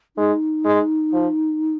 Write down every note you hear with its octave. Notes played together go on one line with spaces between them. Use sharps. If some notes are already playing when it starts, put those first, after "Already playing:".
G#3 D#4
G#3
F3